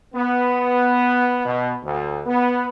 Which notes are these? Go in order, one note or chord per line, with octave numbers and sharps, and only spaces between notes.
B3
B2
D2
B3